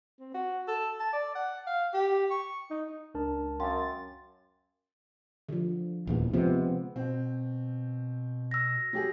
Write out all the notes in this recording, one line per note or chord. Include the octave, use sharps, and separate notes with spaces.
C4
F#4
A4
A5
D5
F#5
F5
G4
C#6
D#4
C#2 D4 A#4 A5
F#2 F5 G5 C6 A6
D3 F3
D#1 A#1 E2
C3 F3 G#3 B3 C4
B2 C4
E6 A#6
F#3 G4 G#4